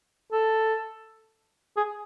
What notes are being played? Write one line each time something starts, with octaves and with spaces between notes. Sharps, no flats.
A4
G#4